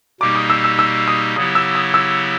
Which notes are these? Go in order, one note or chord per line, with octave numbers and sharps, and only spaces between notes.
B2 G3 A#3 D#4 G4 D6
D#6
E6
E6
E6
D#6
C#3 F#3 B3 E4 G4 D#6
E6
D#6
E6